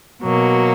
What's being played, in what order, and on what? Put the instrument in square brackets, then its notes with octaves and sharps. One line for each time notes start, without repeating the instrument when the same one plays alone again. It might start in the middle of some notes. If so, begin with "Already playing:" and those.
[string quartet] B2 F#3 A#3